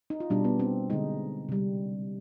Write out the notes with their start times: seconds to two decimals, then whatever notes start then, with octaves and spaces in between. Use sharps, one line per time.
0.10 D#4
0.20 F4
0.30 B2 G3 D4
0.45 B3
0.59 C4
0.90 D3 G#3 D#4
1.49 C3 G3